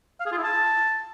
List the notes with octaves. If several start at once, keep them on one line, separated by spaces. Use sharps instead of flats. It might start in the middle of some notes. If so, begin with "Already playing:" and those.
F5
G#4
F4
E4
A5